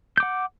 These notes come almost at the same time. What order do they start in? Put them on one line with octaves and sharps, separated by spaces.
G6 D6 F#5